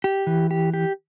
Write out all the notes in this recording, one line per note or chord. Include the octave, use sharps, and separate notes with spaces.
G4
E3
G4
G4